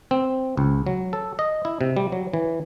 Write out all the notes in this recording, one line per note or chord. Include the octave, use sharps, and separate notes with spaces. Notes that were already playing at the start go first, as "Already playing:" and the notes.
C4
C#2
F#3
A4
D#5
E4
C3
G3
F#3
E3